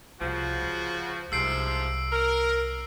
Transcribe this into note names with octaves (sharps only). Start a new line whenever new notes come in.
C2 C#3 F3 F#4
C#2
C2 G#2 C3 F3 E6 C7 D7
A#4